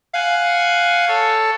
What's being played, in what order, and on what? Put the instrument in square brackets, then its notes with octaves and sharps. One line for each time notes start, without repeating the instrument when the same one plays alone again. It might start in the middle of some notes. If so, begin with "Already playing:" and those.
[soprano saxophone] F5 [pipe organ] F#5 G#5
[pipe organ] A4 C#5